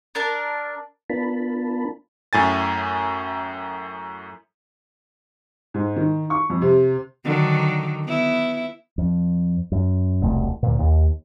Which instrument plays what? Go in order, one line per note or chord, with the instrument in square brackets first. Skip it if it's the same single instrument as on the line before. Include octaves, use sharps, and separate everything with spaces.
[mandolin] D4 A#4 A5
[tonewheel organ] B3 D4 F4 A#4 A5 B5
[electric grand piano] F#2 A2 G#5 A6
[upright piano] G#2
D#3
C#6
F2
C3
[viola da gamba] D3 D#3 F#3
B3 E4
[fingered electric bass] F2
F#2
E1 C2 A3
D2 A#2
D#2